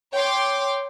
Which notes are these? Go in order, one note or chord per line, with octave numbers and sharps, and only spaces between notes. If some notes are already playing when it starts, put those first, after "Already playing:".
C#5 G5 C6 D6